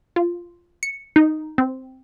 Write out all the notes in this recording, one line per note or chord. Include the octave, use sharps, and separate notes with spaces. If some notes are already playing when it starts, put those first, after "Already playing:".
F4
C#7
D#4
C4